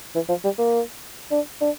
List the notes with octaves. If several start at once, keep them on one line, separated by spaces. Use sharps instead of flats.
E3
F3
G3
A#3
D4
D4